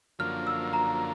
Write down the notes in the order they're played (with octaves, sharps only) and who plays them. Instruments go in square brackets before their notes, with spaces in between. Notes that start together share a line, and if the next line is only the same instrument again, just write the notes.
[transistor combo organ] F#2 D3 F3 A#3 [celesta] F6
[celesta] E6
A#5